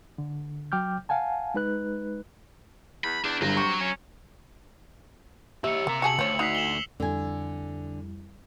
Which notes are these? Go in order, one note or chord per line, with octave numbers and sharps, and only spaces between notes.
D3
F#3 G5 D6 F6 G6
F5 F#5 G#5 A5
G#3 D#4 B4 F#6
E2 B5
E2 D4
G1 F#3 A#5
C3 C#6
C#4
G4 C#5 E5 E6 C#7
C3 A#3 A#5
F#4 G#4 A5 C#7 F#7
D2 F3 C#5
D#4 F#4 B6 C7 F7
E7 F#7 G7
F2 D3 G3 E4 G#5